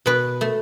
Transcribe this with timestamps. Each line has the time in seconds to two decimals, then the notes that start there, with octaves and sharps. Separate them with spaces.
0.06 B2 B4
0.41 A3